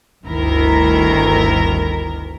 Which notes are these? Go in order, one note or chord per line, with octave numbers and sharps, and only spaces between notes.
G1 D2 D#3 E4 A#4 A#5